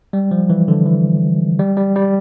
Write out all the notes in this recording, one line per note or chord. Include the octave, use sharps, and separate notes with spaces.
G3
F3
E3
D3
E3
G3
G3
G3